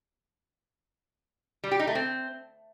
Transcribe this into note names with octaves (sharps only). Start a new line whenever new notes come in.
G3
G4
D#4
A3
C4